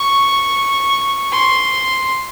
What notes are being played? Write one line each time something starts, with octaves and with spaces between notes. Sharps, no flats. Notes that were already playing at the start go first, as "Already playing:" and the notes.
Already playing: C#6
C6